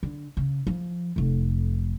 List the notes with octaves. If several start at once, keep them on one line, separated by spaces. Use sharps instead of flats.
D3
C#3
F3
F1 F2